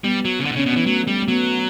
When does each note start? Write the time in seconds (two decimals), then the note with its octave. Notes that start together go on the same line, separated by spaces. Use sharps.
0.04 G3 B3
0.25 F#3
0.40 C#3
0.45 D3 D4
0.52 B2
0.56 C#3
0.59 C#4
0.66 B2
0.73 E3 B3
0.86 F#3 A3
1.07 G3
1.22 A3
1.28 F#3 B3